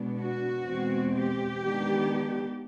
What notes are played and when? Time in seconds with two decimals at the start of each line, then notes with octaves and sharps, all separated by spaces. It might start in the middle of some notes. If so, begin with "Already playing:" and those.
Already playing: B2 G#3 B3 D4
0.18 F#4
0.65 E2 B2 G#3 C4
1.13 G4
1.62 D#3 G#3 B3 D4